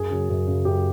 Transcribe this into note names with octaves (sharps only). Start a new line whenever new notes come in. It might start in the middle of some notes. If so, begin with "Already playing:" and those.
Already playing: F#2 G#4
C#3 F#3
F#2
C#3 F#3
F#2 G4